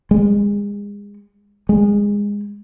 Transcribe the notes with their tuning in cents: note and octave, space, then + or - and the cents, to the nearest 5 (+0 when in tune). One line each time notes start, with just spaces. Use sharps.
G#3 -30
G#3 -20